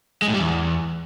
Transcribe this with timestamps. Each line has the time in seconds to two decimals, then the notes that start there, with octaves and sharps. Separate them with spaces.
0.22 G#3
0.28 A2
0.34 G3
0.40 E2